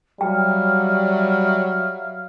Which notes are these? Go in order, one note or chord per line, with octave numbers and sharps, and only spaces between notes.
F#3 G3 E5 F5 G5 F6